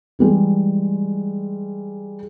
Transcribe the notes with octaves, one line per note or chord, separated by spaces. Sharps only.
E3 G3 G#3